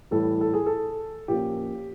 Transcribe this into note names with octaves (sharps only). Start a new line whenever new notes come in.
A2 E3 G3 A4
A4
G#4
A4
A#2 F3 A#3 C#4 G4